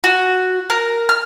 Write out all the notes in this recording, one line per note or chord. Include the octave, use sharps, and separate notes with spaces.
F#4
A#4
F6